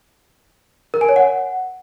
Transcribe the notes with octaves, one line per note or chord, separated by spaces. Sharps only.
A#4
G#5
C#5
F#5